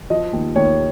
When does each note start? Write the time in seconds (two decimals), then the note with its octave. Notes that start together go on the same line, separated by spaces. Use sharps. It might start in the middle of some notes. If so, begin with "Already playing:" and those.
0.10 F3 D#5
0.33 D#2
0.56 D#2 C#5